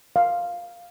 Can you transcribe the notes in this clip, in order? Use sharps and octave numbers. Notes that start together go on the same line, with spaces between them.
F5